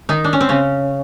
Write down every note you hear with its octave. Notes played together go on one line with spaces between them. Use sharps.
D#3 D#4
D4
C#4
C4
C#3 C#4